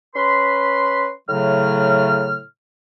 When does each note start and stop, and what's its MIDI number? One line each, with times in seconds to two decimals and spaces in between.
0.15 1.09 61
0.15 1.09 71
0.15 1.09 83
0.15 1.09 84
1.29 2.40 45
1.29 2.40 49
1.29 2.40 54
1.29 2.40 57
1.29 2.40 89